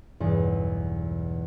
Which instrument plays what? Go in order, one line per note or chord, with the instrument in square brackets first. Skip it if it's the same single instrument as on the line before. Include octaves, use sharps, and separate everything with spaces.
[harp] B1 E2 G2